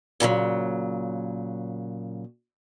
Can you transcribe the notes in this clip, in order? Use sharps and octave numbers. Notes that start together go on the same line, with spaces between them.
A#2 C#3 E3 F#3